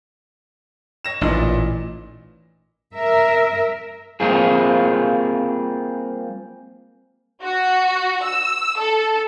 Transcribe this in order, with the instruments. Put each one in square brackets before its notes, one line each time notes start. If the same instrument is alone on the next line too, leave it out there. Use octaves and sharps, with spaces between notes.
[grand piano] C#5 A#6 E7
[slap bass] A1 [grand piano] A#2 E3 D#4
[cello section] A#4 E5
[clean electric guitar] G3 A#3 C4 F4 G#4
[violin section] F#4
E6
A4